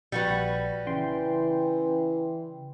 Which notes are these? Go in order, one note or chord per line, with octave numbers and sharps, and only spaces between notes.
A#1 G3 F#4 B4
C#3 E3 G5 C6